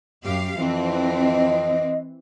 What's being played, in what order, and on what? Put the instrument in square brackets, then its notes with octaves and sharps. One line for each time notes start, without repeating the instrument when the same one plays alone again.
[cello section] F#2 G4 F5
[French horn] F2 [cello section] E3 C4
[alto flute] D#5